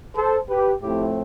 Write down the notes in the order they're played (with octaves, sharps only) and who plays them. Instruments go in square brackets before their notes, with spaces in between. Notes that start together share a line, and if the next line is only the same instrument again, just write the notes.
[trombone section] A4 C5
G4 B4
A2 F3 A3 C4 E4 G4